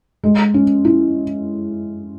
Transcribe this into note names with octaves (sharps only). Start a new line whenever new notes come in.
G#3
C#4
E4